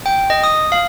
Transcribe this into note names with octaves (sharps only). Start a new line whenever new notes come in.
G5
D#5
D#6
F5